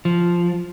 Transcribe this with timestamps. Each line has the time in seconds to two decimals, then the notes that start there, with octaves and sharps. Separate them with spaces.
0.05 F3